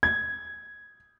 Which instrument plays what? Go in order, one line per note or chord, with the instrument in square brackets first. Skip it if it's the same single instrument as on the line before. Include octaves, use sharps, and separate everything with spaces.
[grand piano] G#6